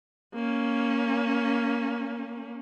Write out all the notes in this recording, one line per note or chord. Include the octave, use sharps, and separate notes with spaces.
A#3 C#4